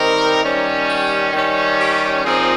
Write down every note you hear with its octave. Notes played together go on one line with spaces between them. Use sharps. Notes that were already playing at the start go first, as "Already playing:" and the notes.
Already playing: D#3 G3 C4 D#4 A#4
D#3 G3 C#4
G4
D#3 G3 C#4
G4
A#2 F3 C4 D#4 G#4